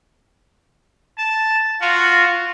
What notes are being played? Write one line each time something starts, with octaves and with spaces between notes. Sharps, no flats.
A5
F4 F#4